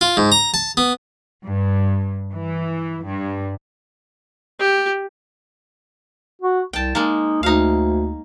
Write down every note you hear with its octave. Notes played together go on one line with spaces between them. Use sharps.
F4
G#2
A#5
A5
B3
G2
E3
G2
G4
F#4
C2 G5 A5
G#3 A#3 D#4
D2 D#4 F5